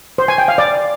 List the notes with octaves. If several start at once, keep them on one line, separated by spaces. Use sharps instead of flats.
C5
G#5
G5
F5
D5